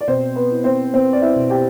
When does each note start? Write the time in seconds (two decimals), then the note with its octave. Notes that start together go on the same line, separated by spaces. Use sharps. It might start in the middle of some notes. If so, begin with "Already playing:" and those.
0.01 D5
0.07 B2 C4 C5
0.36 B3 B4
0.51 E4
0.64 C4 C5
0.93 B3 C4 C5
1.13 D5
1.22 E4 E5
1.35 B2
1.50 G4 G5